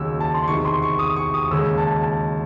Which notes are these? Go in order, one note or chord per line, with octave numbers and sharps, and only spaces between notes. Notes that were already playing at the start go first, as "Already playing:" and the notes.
Already playing: D#2 C#3 F#3 E6
A5
C6
E2 C3 D#3 C#6
C6
C#6
D#6
C#6
D#6
D#2 C#3 G#3 E6
A5
A5